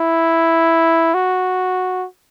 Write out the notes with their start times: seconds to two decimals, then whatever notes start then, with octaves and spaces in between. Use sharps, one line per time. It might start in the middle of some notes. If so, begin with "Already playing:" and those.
Already playing: E4
1.14 F#4